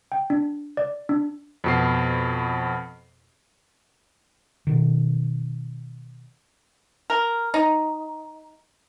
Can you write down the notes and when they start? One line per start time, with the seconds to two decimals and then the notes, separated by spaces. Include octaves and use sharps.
0.12 G5
0.30 D4
0.77 D5
1.09 D4
1.64 F2 B2 C7
4.67 B2 D#3
7.10 A#4
7.54 D#4